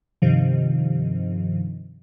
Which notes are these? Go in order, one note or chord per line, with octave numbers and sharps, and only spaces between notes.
G2 C3 D#3 F3